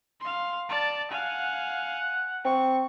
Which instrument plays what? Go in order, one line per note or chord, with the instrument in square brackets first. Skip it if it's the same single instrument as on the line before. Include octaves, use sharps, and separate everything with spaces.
[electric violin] F5 C6
D5 A5
[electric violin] F5 G#5 [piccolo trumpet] F#5
[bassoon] C4 [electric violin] C#6